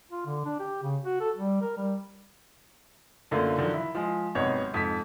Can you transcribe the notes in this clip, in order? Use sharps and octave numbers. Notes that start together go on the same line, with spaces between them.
F4
D3
D4
G4
C#3
F#4
A4
G3
A#4
G3
F#2 D3 A3 A#3 F4
D3 D#3 F3 F#3
E4
F3 G#3
G#1 C3 F#3 B3 C#5 D#5
F2 G#2 B6